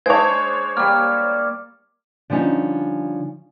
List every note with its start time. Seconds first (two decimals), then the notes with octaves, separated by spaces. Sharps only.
0.06 G#3 D4 C5 C#5 G#6
0.77 G3 A#3 F6
2.30 D3 F3 G3 C#4 D#4